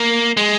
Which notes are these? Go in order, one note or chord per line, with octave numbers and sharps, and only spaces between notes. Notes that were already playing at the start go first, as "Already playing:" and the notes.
Already playing: A#3
G#3